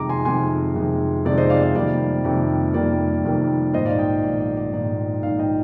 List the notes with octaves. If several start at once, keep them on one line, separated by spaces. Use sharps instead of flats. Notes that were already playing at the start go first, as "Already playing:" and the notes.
Already playing: F2 C3 D#3 G#3 A#5 D6
G#5 C6
F2 C3 D#3 G#3 G#5 C6
F2 C3 D#3 G#3
F2 C3 D#3 G#3 D5
C5 D#5
D5 F5
D5 F5
F2 C3 D#3 G3 A#3 D5
F2 C3 D#3 G3 A#3
F2 C3 D#3 G3 A#3 D5
F2 C3 D#3 G3 A#3
A#1 G#2 D#3 C5 D#5
D5 F5
D#5 G5
A#1 G#2 D#3 D5
D5
D5
A#1 G#2 D#3 D5
A#1 G#2 D#3 D5 F5
D#5 G5